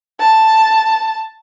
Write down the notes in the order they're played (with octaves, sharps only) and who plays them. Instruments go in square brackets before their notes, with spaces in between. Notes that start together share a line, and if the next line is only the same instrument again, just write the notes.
[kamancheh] A5